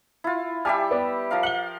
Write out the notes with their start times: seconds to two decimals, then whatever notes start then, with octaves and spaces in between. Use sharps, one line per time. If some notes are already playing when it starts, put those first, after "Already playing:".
0.24 E4 F4
0.65 G3 G4 E5 G#5 A5 F6
0.91 B3 D5
1.31 F3 A#4 F5
1.43 F5 F#7 G7